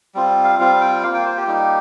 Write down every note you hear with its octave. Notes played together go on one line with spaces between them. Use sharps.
G3 C4 F4
F5
G3 C4 F4 F5
G5
A#3 F4 F5
G5
C5
G4
G3 A#3 D#4